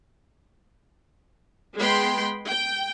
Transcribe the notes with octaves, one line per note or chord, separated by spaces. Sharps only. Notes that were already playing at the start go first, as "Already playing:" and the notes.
G#3 B3 G5 B5 C6
G5